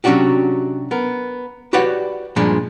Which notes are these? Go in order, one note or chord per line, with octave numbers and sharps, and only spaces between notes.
C3 F#3 C#4 D4 F#4 G4
B3 A#4
F#4 G4 B4 C#5 D5 F#5
G2 A#2 F3 G#3 D4